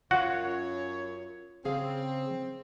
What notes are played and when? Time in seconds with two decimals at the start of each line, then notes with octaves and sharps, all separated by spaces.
0.11 F#2 F4 F#4 C#5 F#5
1.65 C#3 C4 G#4 F5